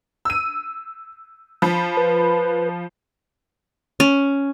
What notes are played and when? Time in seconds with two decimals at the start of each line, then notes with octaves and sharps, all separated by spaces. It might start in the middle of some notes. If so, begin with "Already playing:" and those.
0.25 E6 D#7
1.62 F3 B5
1.97 B4
4.00 C#4